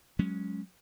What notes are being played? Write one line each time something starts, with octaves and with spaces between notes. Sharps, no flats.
F#3 G#3 C#4